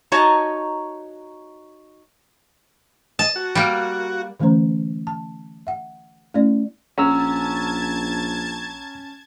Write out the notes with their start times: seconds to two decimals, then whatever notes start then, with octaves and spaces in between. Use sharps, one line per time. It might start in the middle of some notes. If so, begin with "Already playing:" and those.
0.12 D#4 F#4 C#5 D#5 A5 A#5
3.19 D#5 A5
3.36 F#4
3.55 G3 A#3
4.40 D3 E3 A3 C#4 C5 A#5
5.07 A5
5.67 E5 F#5
6.34 A3 C#4 E4 D5
6.98 A#1 C#4 F#5 A5 A#5 E6 G#6